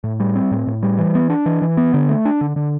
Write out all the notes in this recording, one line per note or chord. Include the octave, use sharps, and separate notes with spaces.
A2
G3
C4
A2
A2
G3
E3
B3
D4
E3
E3
B3
D3
A3
D4
D3
D3